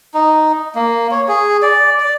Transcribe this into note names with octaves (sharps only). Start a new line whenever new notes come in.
D#4
A#3
C#5
G#4
D5
D5